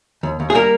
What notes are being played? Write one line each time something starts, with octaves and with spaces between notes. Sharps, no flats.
D#2
D#2
G#4
G3 A#3 A#4